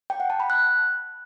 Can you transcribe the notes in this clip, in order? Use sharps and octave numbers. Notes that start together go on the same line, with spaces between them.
G5
F#5
A5
B5
F#6